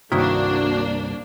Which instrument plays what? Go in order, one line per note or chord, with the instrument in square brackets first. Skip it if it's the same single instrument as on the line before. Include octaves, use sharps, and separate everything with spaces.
[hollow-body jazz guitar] C2 G2 [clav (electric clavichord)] D#3 E4 [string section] A#3 D4 [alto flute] F#4